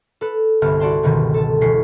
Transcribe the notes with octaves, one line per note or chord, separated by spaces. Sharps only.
A4 B4
G1 C2 B3 A5 F6
F#4 D5 A5 C6
G1 C#2 B2 D#3
A4 A5
E1 C#4 B6 C7